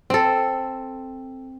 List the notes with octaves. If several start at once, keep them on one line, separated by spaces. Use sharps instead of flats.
C4 A4